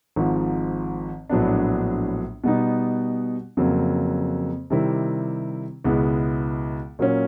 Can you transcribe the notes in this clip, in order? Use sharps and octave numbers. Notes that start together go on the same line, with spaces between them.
G#1 G#2 F3
A#1 A2 F#3 B3 D4
B2 G3 B3 D#4
F2 C#3 F#3 A#3
C3 D#3 G3 C4 E4
C#2 B2 G#3 B3 E4
A#2 F#3 A#3 C#4